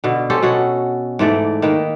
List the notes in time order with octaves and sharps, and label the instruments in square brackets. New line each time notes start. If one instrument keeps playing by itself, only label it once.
[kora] B2 D3
C#4 G4 A4 C5
B2 F#4 A4 C#5
G#2 E3 A3 D5
D#3 A#3 B4